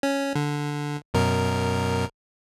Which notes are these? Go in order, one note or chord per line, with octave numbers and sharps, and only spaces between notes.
C#4
D3
F#2 B2 A#4